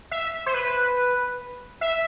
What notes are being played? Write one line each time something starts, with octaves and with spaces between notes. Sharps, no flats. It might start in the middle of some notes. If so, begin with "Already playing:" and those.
E5
C5
B4
E5